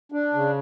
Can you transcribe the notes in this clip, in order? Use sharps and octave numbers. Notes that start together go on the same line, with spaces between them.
D4
C#3